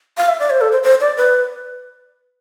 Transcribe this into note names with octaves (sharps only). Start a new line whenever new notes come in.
F5
E5
D5
C5
A4
C5
C5
D5
B4